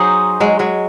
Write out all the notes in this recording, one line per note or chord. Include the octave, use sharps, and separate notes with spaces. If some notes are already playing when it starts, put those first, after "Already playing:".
Already playing: F#3 D#4 G#4 C5
F#3 G#3
F#3 G#3